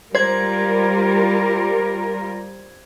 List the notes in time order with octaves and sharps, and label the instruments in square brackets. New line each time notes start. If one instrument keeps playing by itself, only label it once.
[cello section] G3 F4 A#4 [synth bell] C5 G#6